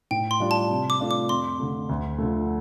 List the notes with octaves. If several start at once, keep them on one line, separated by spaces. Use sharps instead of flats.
A2 G5
C6
G3 D4 F4
A5
C3
D6
A3 D4 F4
D6
F2 C6
D3 A3
D2
D3 F3 A3